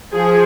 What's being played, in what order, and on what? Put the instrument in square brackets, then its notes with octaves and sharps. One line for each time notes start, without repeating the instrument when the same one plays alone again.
[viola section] F3 G#4